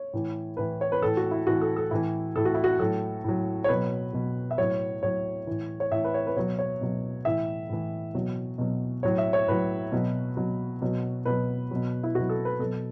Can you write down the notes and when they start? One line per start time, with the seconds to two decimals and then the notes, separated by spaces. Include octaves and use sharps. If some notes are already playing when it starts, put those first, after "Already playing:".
Already playing: C#5
0.13 A2 E3
0.57 A2 E3 B4
0.81 C#5
0.92 B4
1.01 A2 E3 A4
1.17 F#4
1.31 E4
1.46 A2 E3 F#4
1.61 A4
1.76 A4
1.91 A2 E3 E4
2.36 A2 E3 A4
2.45 F#4
2.54 E4
2.64 F#4
2.79 A2 F#3 A4
3.24 A2 F#3
3.64 C#5
3.69 B2 F#3 B4
4.13 B2 F#3
4.51 E5
4.58 A2 F#3 C#5
5.03 A2 F#3 C#5
5.47 A2 E3
5.80 C#5
5.91 A2 E3 E5
6.04 B4
6.14 C#5
6.27 B4
6.36 B2 F#3 C#5
6.59 C#5
6.81 B2 F#3
7.25 A2 E3 E5
7.69 A2 E3
8.14 B2 F#3
8.58 B2 F#3
9.03 A2 F#3 C#5
9.18 E5
9.33 C#5
9.48 A2 F#3 B4
9.92 B2 F#3
10.37 B2 F#3
10.82 B2 F#3
11.25 B2 F#3 B4
11.71 B2 F#3
12.03 E4
12.15 B2 F#3 F#4
12.29 A4
12.45 B4
12.59 B2 F#3 A4